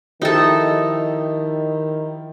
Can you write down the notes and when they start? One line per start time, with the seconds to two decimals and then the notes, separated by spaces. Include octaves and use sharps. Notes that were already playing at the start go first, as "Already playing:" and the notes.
0.22 D#3 F3 D#4 E4 G4 A4